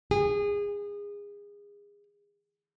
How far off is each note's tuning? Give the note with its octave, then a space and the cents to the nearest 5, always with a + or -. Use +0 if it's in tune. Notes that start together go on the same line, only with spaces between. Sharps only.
G#4 -25